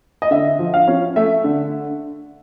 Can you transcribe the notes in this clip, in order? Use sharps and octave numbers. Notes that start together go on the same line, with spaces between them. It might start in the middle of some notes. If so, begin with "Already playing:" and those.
D#5
D3 E5
F3
F5
C#4
A3 E5
D3